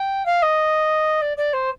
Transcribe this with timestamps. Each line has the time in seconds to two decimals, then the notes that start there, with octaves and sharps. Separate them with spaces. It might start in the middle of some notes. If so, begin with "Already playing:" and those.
Already playing: G5
0.26 F5
0.42 D#5
1.22 D5
1.37 D5
1.53 C5